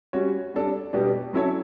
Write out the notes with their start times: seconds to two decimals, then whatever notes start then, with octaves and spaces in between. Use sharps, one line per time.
0.13 G3 C#4 F#4 C#5
0.54 G3 D4 A4
0.93 B2 G3 B3 D4 G4
1.33 F#3 C#4 E4 A4 C#5